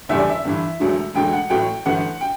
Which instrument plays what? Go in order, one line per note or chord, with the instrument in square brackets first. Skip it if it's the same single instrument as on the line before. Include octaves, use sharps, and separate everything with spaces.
[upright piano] F#1 E2 D3 G3 E5
D5
E5
G1 G2 E3
E1 D2 D3 F#3
E1 D2 D3 G5
F#5
A1 A2 F#3 A3 G5
G1 F#2 E3 A3 F#5
G5